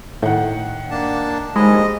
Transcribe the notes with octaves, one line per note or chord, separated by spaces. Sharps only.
A2 D#3 F#5
A#3 D4 A5
A#1 D#2 G#2 G#3 D#5 B5